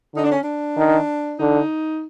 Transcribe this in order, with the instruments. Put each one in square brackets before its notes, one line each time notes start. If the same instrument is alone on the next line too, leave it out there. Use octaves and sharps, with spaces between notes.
[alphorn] D3 [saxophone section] D#4
[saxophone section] D4
C#4
D4
[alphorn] D#3
[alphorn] D3 [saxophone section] D#4